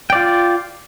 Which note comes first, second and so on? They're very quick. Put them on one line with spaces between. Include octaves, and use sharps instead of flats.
G5 D5 F4